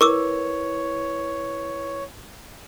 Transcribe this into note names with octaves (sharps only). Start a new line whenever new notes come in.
E4 A#4 B4 C#5 C#6 D6 E6